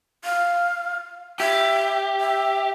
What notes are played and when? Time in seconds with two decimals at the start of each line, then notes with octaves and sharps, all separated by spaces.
0.24 F5
1.40 G4 E5
2.21 E5